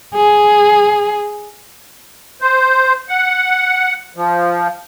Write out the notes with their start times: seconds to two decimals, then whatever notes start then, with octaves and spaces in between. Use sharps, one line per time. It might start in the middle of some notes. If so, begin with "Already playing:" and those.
0.15 G#4
2.41 C5
3.09 F#5
4.16 F3